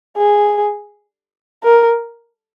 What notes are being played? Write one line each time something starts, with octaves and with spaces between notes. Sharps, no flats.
G#4
A#4